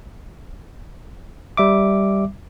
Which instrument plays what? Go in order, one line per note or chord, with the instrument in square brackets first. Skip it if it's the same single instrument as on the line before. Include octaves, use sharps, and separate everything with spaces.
[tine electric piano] G3 E5 D6